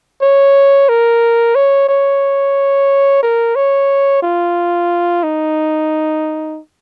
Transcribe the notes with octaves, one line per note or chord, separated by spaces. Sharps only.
C#5
A#4
C#5
C#5
A#4
C#5
F4
D#4